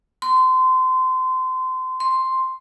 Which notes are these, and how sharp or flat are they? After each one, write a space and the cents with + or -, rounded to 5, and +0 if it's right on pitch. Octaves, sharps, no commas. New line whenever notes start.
C6 -25
C6 +0